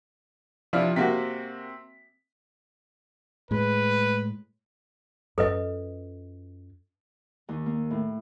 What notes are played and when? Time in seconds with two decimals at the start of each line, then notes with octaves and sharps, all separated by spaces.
0.73 C3 F3 D4 E4 F4
0.96 C3 A#3 C4 F#4 B6
3.51 A2 G#3 B4
5.38 F#2 F4 A4 B4 D#5
7.49 D#2
7.66 A#3
7.91 A2